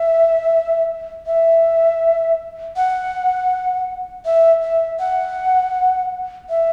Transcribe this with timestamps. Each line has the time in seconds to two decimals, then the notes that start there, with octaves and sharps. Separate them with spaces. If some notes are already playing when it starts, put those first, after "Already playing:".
Already playing: E5
1.26 E5
2.76 F#5
4.25 E5
4.63 E5
4.99 F#5
6.50 E5